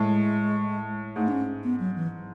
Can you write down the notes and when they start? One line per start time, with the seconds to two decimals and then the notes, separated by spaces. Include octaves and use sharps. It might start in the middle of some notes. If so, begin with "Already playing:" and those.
Already playing: A2 G#3
1.16 G#2 A3
1.28 D4
1.32 C#4
1.64 B3
1.80 F#3
1.96 E3